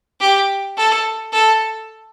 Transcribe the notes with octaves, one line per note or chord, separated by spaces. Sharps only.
G4
A4
A4